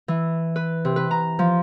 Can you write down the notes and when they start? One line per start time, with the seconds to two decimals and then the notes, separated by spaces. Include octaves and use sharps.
0.08 E3
0.56 B4
0.85 C3
0.96 B4
1.11 A#5
1.39 F3